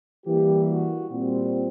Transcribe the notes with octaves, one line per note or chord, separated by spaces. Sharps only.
E3 G3 A#3 G4
F#4
A#2 G3 C4